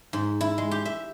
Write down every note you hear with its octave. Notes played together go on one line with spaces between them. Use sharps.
G#2
E4
G#3
G4
E5